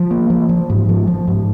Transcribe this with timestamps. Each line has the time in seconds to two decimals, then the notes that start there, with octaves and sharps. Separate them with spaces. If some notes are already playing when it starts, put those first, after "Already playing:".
Already playing: F3
0.11 A#3
0.30 F3
0.49 F3
0.70 G#2
0.89 F3
1.07 F3
1.28 G#2